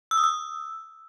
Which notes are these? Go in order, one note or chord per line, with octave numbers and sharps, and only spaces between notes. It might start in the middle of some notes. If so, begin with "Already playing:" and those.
E6
D#6
E6